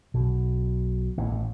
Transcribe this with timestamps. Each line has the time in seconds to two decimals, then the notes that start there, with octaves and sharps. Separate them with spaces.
0.14 B1 B2
1.17 A1 A2